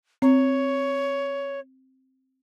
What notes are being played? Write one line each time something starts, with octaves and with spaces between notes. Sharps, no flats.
C4 C#5